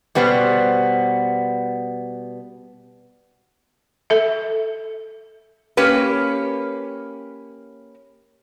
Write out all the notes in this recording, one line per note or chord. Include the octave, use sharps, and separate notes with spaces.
B2 G3 B3 B4 C5
A4 E5
A#3 C#4 G4 B4